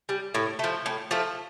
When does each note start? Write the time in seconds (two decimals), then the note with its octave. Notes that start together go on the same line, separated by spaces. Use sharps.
0.09 G3
0.34 A2
0.59 F3 A3
0.86 A2
1.11 F3 A3